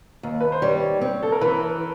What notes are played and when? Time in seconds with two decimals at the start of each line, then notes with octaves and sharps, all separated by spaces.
0.23 D#2
0.41 B4
0.52 C5
0.62 G3 C#5
1.01 C4
1.23 A4
1.32 A#4
1.41 E3 B4